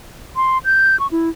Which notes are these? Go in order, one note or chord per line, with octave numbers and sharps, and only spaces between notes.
C6
G6
C#6
E4